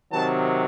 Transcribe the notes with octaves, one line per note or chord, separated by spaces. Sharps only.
C3 D#3 F#3 A5